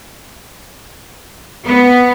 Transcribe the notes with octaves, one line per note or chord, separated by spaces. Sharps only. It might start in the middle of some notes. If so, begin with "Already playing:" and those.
B3